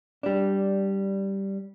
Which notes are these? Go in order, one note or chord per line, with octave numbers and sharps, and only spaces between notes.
G3 D4